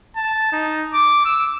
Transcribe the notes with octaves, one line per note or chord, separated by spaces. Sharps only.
A5
D#4
D6
E6